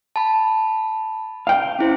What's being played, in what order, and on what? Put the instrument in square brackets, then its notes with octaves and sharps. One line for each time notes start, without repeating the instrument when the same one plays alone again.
[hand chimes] A5 B5
[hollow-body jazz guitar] F5 G5
[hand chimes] C#4 E4 C5